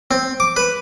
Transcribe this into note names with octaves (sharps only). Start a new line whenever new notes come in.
C4
D6
B4